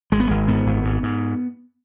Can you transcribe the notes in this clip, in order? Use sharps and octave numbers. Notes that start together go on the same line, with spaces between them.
G#1 G#3
B3
G#1 G#3
G#2 B3
G#1
G#2
G#2